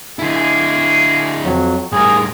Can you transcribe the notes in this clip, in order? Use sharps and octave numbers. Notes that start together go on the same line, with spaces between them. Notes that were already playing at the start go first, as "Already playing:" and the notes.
D3 G#3 A#3 E4 G#4
F2 F#3
A2 F3 G3 G#4 A#4